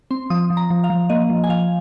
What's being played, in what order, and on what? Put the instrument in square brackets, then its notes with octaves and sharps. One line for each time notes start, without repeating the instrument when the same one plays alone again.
[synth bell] C4 C6
F3 D#6
F3
A#5
F3
F5
F3
A#3 D#5
F3
G#5
F3 F5